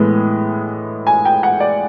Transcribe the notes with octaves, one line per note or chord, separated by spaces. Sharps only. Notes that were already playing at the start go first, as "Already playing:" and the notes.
Already playing: A2 E3 G#3 B3
G#5
G5
F#5
D5